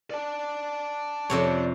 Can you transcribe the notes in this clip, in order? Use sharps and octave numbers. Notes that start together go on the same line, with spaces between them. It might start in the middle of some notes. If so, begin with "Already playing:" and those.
D5 A5
F2 C3 C#5